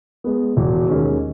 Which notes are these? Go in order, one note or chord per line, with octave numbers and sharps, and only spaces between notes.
G#3 B3
E1
D#2 D#3 G#3 C#4